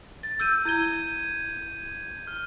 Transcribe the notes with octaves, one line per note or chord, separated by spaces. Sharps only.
A6
E6 G6 D#7
E4 G6 G#6 D#7 G7
F6